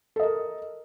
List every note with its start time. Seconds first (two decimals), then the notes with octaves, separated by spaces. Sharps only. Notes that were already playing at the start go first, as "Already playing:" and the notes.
0.16 A4
0.20 D#5
0.23 A#4